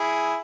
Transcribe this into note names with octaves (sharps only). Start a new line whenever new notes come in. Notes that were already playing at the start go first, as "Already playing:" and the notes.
Already playing: E4 G#4